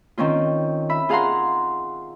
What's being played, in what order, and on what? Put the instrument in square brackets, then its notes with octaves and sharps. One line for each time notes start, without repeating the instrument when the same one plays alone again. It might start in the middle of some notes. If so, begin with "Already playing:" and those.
[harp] D#3 C4 C#4 F4
E5 B5
F4 G#4 F5 F#5 A#5 C6